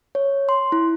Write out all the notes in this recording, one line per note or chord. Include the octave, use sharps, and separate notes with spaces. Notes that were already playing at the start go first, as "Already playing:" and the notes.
C#5
C6
E4